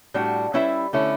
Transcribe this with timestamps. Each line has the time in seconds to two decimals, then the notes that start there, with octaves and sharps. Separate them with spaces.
0.14 A2 G3 D4 F#4
0.54 G3 C#4 E4 B4 E5
0.93 D3 A3 C#4 E4